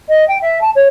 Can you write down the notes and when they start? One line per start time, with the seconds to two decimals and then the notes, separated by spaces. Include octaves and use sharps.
0.08 D#5
0.27 G5
0.41 E5
0.61 A5
0.75 C#5